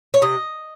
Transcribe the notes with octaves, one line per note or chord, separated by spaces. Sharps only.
C#5
C3 D#5